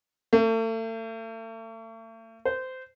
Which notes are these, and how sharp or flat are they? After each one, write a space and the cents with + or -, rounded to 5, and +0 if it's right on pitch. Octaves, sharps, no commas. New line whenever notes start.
A3 +40
C5 -20